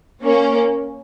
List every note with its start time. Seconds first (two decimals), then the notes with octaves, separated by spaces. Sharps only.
0.23 A#3 C#4